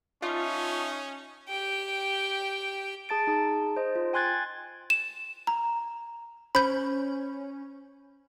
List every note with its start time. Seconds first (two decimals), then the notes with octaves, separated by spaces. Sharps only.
0.22 C#4 D#4 F4 E5 A5 C#6
1.49 G4 G5
3.09 G#4 A5 A6 D7
3.27 D#4 G#4 A5
3.76 C5 D#5
3.95 F4
4.13 G5 G#5 C6 F#6 G#6 A6
4.90 E7
5.47 A#5
6.55 C#4 C5 B5 G6